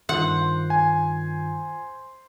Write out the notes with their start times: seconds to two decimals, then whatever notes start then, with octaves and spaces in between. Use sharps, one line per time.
0.09 G2 D#3 F4 C5 F#5
0.70 G#5